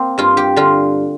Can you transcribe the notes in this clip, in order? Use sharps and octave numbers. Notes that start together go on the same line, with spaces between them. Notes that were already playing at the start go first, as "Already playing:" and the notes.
Already playing: A#3 C4
G2 F4
G4
D3 F4